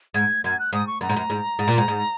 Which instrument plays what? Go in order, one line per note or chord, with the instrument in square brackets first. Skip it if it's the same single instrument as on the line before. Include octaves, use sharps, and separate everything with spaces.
[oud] G#2 [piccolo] G#6
[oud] F#2 [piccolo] G#6
[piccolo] F#6
[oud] G#2 [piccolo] D#6
[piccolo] C#6
[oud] F#2 [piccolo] A#5
[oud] G#2
F#2
G#2
G#2
A#2
G#2
G#2